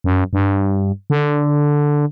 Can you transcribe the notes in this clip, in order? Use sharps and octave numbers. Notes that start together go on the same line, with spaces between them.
F#2
G2
D3